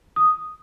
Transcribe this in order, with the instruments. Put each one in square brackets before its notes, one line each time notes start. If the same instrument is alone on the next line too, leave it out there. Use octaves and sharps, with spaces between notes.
[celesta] D#6